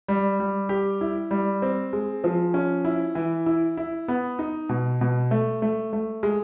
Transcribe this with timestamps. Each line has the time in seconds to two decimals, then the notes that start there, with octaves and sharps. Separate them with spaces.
0.08 G3
0.40 G3
0.69 G4
1.01 E4
1.31 G3
1.62 C4
1.93 G#3
2.24 F3
2.54 C#4
2.85 E4
3.15 E3
3.46 E4
3.77 E4
4.08 B3
4.39 D#4
4.69 B2
5.01 B2
5.31 A3
5.62 A3
5.93 A3
6.23 G#3